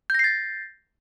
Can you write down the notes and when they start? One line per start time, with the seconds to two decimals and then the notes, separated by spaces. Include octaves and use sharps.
0.10 G6
0.14 A#6
0.19 C7
0.24 A6